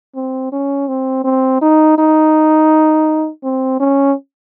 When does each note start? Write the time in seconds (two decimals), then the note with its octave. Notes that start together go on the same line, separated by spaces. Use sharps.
0.16 C4
0.52 C#4
0.88 C4
1.24 C4
1.61 D#4
1.98 D#4
3.44 C4
3.80 C#4